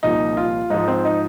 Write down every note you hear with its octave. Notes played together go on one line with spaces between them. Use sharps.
C2 A#2 F3 D#4
F4
G#2 F3 D#4
C4
D#4